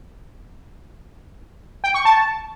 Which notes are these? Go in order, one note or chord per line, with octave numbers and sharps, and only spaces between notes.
G5
C#6
A5